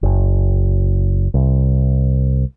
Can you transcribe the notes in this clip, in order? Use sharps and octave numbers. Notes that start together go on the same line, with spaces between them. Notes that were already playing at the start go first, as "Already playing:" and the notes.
F#1
C2